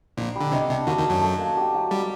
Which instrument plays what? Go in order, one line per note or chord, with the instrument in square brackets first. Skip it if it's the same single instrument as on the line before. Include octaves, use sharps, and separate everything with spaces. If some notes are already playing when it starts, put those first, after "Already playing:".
[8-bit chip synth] A#1 A#2 [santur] D#4
[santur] G3
[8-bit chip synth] D3
[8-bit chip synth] C2 C3 [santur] D#5
[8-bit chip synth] C2 C3 [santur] D4
[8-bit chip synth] D#2 D#3 [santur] F#4
[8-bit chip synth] D#2 D#3
[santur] A3
[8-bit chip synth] F#2 F#3
[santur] A4
A#3
G4
F#3
[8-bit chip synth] G3 [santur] G4